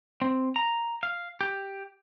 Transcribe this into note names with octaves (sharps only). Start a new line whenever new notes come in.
C4
A#5
F5
G4